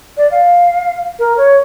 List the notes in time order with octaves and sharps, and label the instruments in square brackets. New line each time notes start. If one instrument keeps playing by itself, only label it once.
[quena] D5
F5
A#4
C#5